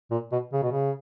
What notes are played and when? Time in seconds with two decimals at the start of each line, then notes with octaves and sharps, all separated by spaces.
0.11 A#2
0.32 B2
0.53 C#3
0.63 B2
0.72 C#3